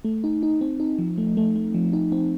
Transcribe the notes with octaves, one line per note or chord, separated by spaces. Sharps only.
A3
D#4
D#4
C4
D#4
F3
A3
A3
A3
F3
D#4
C4